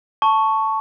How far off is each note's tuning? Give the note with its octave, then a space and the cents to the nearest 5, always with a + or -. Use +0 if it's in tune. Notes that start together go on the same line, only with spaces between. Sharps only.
A5 +0 C#6 +0